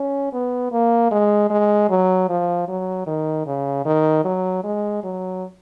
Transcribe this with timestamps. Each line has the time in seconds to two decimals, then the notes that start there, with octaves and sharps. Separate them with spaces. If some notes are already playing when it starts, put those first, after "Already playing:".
Already playing: C#4
0.33 B3
0.72 A#3
1.11 G#3
1.50 G#3
1.90 F#3
2.29 F3
2.68 F#3
3.07 D#3
3.46 C#3
3.85 D#3
4.24 F#3
4.64 G#3
5.03 F#3